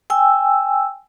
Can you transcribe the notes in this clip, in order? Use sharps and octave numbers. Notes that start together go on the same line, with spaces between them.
G5 G#5 E6